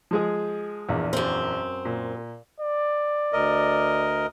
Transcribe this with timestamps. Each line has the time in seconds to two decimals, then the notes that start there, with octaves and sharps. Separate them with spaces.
0.11 F3 G#3 G#4
0.89 A#1 E2
1.13 F#2 C4
1.85 A#2
2.60 D5
3.33 D2 A#4 D#5